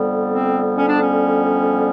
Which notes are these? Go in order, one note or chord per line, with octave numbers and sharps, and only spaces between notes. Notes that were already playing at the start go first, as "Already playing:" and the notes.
Already playing: F2 D3 G3 B3
C4
C#4
D4
C#4